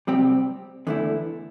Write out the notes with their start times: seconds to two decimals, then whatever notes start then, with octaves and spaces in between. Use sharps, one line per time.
0.07 C3 G3 C4 G4
0.87 E2 D3 A3 E4